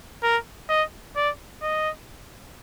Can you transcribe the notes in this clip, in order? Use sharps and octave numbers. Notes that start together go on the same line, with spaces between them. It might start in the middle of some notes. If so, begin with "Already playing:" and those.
A#4
D#5
D5
D#5